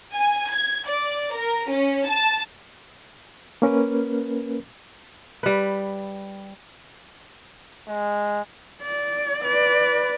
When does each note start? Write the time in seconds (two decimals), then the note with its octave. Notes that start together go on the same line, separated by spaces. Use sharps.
0.14 G#5
0.52 G#6
0.88 D5
1.33 A#4
1.70 C#4
2.08 A5
3.62 A#3 C#4 A#4 B4
5.43 G3 B4
7.89 G#3
8.83 D5
9.44 B4 D5